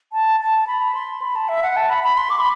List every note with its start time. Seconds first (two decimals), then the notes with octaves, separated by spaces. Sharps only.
0.13 A5
0.40 A5
0.67 B5
0.95 C6
1.22 B5
1.36 A5
1.49 E5
1.63 F#5
1.77 A5
1.90 B5
2.04 B5
2.17 C6
2.30 D6
2.39 B5